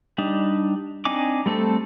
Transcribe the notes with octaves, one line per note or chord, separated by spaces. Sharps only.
G3 D4 D#4
C4 D4 D#4 G#5 D6
G3 A3 C4 A4